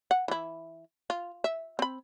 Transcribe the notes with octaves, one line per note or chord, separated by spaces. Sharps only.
F#5
E3 E4
F4
E5
C4 B5